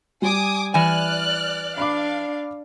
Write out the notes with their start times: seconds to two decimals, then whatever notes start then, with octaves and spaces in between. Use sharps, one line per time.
0.22 G3 G#5 D6 D#6
0.74 E3 D5 G#5 F6 F#6
1.78 D4 F5 B5 D6